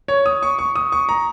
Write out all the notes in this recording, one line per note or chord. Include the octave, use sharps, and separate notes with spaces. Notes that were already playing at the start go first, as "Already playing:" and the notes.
C#5
D#6
C#6
C#6
D#6
C#6
A#5